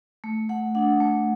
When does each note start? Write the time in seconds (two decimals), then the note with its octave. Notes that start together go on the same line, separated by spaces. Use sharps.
0.24 A3
0.49 A3 F#5
0.75 D4 F#5
1.00 A3